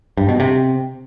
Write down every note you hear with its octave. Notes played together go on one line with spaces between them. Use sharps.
G2
B2
C3